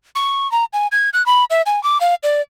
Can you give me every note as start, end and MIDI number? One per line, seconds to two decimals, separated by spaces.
0.15 0.50 85
0.52 0.65 82
0.73 0.87 80
0.92 1.10 92
1.13 1.25 90
1.26 1.44 83
1.50 1.62 76
1.66 1.82 80
1.83 1.98 86
2.01 2.14 77
2.23 2.41 74